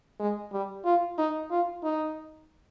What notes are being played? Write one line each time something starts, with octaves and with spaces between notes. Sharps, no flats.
G#3
G3
F4
D#4
F4
D#4